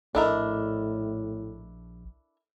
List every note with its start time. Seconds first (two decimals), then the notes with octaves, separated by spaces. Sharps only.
0.15 A#1 A2 D4 E4 A4 A#4 D#5 E5